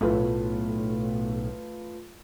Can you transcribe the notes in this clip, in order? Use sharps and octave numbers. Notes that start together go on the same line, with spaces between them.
B1 A2 A3 F4 B4